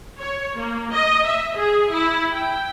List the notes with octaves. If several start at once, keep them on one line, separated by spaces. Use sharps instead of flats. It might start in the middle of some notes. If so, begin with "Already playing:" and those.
C#5
A#3
D#5
E5
G#4
E4
G5